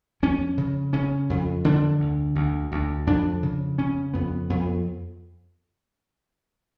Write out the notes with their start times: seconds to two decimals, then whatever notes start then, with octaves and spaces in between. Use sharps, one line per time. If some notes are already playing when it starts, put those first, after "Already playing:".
0.23 F2 C#4
0.58 C#3
0.93 C#3 C#4
1.30 F2
1.65 D3 D4
2.00 D2
2.35 D2
2.72 D2
3.07 F2 D4
3.43 C#3
3.78 C#3 C#4
4.14 F2 B3
4.50 F2 B3